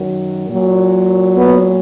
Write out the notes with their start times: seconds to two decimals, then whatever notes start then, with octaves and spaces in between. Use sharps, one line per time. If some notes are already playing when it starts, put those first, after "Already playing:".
Already playing: F#2 D#3 F#3
0.49 A#2 F#3
1.36 B3